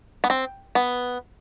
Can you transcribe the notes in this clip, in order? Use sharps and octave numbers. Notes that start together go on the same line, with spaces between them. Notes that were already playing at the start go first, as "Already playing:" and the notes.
B3
C4
B3